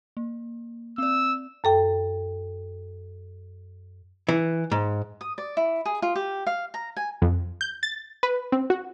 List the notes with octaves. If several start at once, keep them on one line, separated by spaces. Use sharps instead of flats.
A#3
C4 D5 E6
F#2 A4 G5
E3
G#2
D#6
D5
E4
G#4
F4
G4
F5
A#5
G#5
F2
G6
A6
B4
C4
F#4